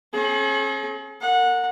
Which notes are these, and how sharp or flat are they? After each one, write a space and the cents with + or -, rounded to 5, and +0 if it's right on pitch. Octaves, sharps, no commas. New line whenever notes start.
C#4 -40 G#4 +40
A#4 -30 F#5 -20